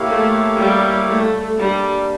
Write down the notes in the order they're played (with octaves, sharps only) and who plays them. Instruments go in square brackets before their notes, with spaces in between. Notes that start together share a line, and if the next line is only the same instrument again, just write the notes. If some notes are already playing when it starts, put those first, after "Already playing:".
Already playing: [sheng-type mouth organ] A#3 E4 G4 C#5 F5
[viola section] A3
G3
A3
[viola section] G3 [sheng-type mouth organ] A#3 D4 G4